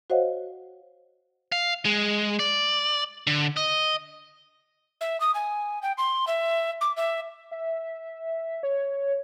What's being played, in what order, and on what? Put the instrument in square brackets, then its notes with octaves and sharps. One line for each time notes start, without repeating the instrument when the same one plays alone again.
[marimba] F#4 C5 C#5 D#5 F5 F#5
[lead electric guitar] F5
G#3
D5
D3
D#5
[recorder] E5
D#6
G#5
G5
C6
E5
D6
E5
[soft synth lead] E5
C#5